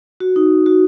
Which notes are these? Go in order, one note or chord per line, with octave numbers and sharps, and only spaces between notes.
F#4
D#4
F#4